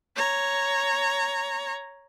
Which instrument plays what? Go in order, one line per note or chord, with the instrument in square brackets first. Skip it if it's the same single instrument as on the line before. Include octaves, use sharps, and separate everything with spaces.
[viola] C#5 A#5